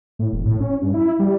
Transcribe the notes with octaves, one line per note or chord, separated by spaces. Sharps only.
A2
E1
A2
C#4
G2
E4
G3